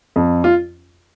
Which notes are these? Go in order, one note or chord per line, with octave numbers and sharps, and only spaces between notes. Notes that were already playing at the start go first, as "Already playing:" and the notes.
F2
F4